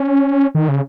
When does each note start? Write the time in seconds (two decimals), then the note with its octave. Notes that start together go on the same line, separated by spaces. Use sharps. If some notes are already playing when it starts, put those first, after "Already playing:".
Already playing: C#4
0.55 D#3
0.69 C#3